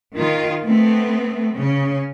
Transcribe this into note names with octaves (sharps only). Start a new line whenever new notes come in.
D#3 F4
A3 B3 C4
C#3 C#4